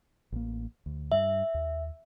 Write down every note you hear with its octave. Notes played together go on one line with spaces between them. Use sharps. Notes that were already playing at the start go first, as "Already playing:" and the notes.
A1 A#3
D2
G2 E5
D#2